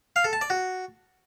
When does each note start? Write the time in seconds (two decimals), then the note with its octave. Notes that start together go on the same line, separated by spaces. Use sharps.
0.16 F5
0.24 A4
0.33 A5
0.41 D5
0.50 F#4